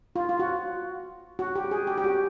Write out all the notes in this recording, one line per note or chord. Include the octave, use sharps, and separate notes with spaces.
F4
F4
F#4
F#4
G4
G#4
G4
G4
F#4